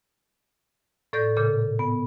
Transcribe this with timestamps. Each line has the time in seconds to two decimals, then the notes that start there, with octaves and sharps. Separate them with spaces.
1.13 A2 A4 D5 G6 A#6
1.37 A#2 C#3 A4 G6
1.79 B3